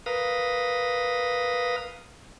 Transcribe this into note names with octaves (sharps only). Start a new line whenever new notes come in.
A#4 B4 F5 D#6